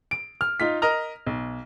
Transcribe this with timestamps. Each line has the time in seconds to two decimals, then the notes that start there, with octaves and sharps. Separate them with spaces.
0.11 D7
0.41 F6
0.60 D#4 F4 B6
0.82 A#4 D#5 A#5 F6
1.26 B1